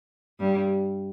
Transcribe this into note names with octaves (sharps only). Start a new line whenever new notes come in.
G2 G3